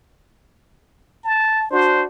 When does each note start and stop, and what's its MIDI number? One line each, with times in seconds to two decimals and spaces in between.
1.24 1.70 81
1.71 2.05 62
1.71 2.05 66
1.71 2.03 72